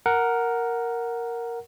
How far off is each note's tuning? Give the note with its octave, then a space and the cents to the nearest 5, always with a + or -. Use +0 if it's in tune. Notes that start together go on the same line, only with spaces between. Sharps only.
A#4 +0 F#5 +0